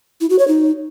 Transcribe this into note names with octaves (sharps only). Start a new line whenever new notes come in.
E4
F#4
C#5
D#4